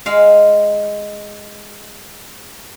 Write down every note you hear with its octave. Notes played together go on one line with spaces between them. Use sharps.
G#3 F5